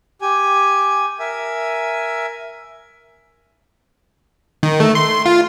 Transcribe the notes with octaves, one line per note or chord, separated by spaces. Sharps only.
G4 G#5
A#4 E5 G#5
D#3
A3
C6
F4